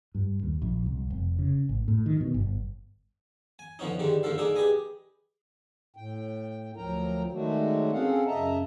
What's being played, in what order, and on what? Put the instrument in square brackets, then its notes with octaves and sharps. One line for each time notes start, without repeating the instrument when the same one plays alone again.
[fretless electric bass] G2
D#2
A#1
C2
F1
C#3
A1
A2
D#3
B2
G1
[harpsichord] G#5
D3 F3 B3 C#4 D#4
G2 D3 D#3 G3 G#3
A#1 G2 D3 F3 A4 F5
A#3 D4 D#4 G#4 A4
G4 G#4 B4 D#5 G#5
[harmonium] A2 G5
D2 F3 F#3 A#4 G5 A#5
D#3 F#3 G#3 A3 D4 F#4
C4 C#4 G#4 A4 F5 F#5
F#2 C#3 D#5 E5 A5 A#5